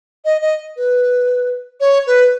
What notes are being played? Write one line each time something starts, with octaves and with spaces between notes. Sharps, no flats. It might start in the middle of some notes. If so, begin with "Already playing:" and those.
D#5
D#5
B4
C#5
B4